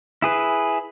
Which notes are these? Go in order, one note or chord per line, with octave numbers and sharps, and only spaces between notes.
E4 G#4 B4